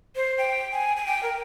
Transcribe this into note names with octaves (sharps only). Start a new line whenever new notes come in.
C5
G5
G#5
G#5
G5
A#4